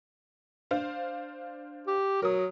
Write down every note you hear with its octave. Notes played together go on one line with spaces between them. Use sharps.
D4 C5 F5
G4
F#3 A#4 D#6